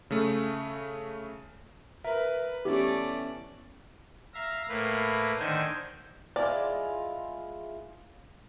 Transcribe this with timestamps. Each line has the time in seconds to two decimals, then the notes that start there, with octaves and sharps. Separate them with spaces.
0.10 C#3 A3
2.04 A#4 B4 E5
2.65 E3 A3 B3 C#4 G4 D5
4.34 E5 F5 A#5
4.69 A2 A#3 B4
5.39 D3 D#3 C5 G#5
6.36 G#3 E4 F4 D5